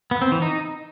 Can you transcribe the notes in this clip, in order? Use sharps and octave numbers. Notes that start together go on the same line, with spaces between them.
B3
C4
E3
D#4